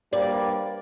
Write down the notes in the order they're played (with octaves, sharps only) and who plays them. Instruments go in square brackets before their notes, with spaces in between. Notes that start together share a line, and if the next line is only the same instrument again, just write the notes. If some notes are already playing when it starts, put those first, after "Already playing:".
[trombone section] G2 G3 A#3 [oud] D5